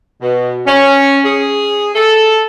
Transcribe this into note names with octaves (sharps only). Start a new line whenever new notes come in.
B2
C#4
G#4
A4